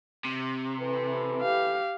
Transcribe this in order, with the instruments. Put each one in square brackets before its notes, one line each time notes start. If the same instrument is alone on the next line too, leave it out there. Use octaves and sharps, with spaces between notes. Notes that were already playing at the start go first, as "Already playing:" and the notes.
[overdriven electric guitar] C3
[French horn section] E3 A4 B4
[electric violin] G4 F5